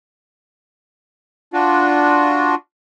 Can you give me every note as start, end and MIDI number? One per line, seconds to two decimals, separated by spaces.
1.53 2.55 62
1.53 2.55 65
1.53 2.55 66